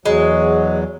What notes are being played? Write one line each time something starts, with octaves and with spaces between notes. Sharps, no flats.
E2 F#3 G#3